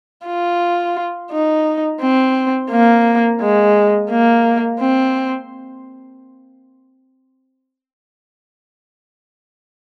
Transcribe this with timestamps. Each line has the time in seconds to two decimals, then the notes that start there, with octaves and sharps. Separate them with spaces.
0.27 F4
1.32 D#4
2.01 C4
2.71 A#3
3.41 G#3
4.10 A#3
4.80 C4